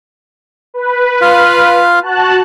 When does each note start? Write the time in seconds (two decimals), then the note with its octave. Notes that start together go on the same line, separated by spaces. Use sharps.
0.74 B4
1.21 F4 F5
2.02 F#4 A5 F#6